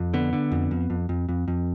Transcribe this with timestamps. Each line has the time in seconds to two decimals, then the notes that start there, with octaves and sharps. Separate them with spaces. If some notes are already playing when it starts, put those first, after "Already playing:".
Already playing: F2
0.14 D3 B3
0.33 D3
0.52 F2
0.71 F2
0.90 F2
1.09 F2
1.29 F2
1.48 F2